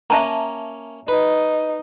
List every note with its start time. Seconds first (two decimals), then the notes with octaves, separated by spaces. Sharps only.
0.10 A#3 C#4 E5 A5 A#5
1.08 D#4 B4